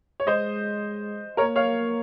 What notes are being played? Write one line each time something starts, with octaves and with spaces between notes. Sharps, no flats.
C#5
G#3 C5 D#5
A#3 A#4 C#5
C#5 F5